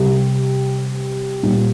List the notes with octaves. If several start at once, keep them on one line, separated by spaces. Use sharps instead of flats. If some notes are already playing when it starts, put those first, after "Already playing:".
Already playing: C3 G3 G4
A#2 G3